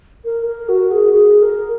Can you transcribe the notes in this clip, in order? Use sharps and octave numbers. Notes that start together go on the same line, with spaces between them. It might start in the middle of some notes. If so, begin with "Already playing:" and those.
A#4
A#4
F#4
G#4
G#4
A#4